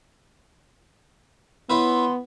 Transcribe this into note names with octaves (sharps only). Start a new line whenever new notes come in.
B3 E4 B4 C#5 C6